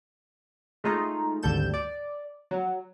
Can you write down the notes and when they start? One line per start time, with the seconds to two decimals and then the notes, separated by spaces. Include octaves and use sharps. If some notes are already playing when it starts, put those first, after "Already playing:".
0.84 G#3 A3 D#4 F4 A#5
1.43 G#1 D2 G3 A4 G6 E7
1.74 D5
2.51 F#3